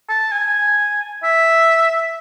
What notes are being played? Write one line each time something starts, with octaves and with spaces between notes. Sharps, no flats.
A5
G#5
E5